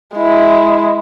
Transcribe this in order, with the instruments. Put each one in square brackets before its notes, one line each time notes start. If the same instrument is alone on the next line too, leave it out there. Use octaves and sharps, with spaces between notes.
[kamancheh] G#3 E4